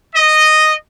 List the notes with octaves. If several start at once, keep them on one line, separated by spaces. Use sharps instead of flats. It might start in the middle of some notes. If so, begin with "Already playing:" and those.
D#5